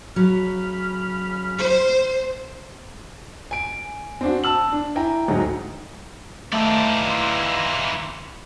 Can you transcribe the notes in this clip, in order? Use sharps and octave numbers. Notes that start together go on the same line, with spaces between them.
C#3 F#3 B5 F6
C5
G#5 D7
C4 D4 F#4
A5 E6 F#7
D4
E4 G5 G#5 A#5
D2 G#2 F#3 G#3
E3 A3 D#4 F4 D5 E5 A5
C6